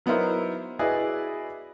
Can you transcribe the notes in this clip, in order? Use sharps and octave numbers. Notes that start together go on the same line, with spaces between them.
F#3 B3 D#4 E4 A#4 C5
E4 F#4 G#4 B4 D5 D#5